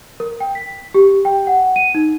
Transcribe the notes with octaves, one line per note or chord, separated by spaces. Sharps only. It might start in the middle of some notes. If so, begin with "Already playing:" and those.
A#4
G5
B6
G4
G5
F#5
D#7
D#4